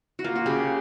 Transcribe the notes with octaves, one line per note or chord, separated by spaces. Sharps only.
F#4
A#3 F4
F#4
C#3 G4